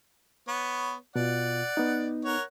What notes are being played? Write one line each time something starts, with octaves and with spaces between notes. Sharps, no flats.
B3 C#5
B2 F4 D5 F#5
B3 D#4
A#4 C#5 F#5